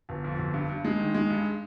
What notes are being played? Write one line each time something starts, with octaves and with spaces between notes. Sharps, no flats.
G1
F2
G1
G2
G2
G#3
D#3
G#3
G2